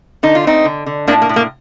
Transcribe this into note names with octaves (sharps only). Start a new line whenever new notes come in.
D3 D#4
F4
A3 C4 D#4
D3
D3
A2 A#3 D4
A#3
A2
A#3